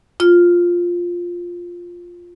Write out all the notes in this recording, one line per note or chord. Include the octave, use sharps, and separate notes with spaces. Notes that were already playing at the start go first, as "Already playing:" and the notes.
F4 F6